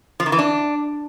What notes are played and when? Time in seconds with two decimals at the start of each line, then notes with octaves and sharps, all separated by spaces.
0.20 F3
0.26 D#3
0.32 E3
0.39 D4